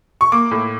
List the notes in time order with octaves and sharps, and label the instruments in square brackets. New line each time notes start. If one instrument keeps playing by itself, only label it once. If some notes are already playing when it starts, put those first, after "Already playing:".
[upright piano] C#6
A#3 D6
A2